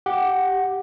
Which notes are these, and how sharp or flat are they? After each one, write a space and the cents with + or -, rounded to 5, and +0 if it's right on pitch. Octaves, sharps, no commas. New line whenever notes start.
G4 +0 F#5 +0